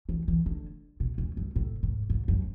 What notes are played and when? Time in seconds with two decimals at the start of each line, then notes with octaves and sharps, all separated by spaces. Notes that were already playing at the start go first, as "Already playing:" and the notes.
0.09 E3
0.28 E3
0.46 D3
1.00 B2
1.18 E2
1.37 F#2
1.56 A2
1.83 G#2
2.10 G#2
2.28 F#2